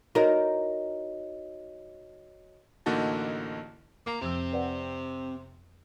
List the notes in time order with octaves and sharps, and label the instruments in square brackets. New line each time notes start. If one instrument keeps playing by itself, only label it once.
[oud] D#4 A#4 [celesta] F#4 C#5 D#5
[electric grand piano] A1 D3 A#3 D#4 F#4 A5
[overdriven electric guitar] D2 A#5 [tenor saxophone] A#3
[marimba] F2 F3 E6 [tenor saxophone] C3 [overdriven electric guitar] C4
[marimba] B4 D5 F#5